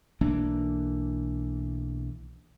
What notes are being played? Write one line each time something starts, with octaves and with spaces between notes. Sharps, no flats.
B1 E3 A#3 D4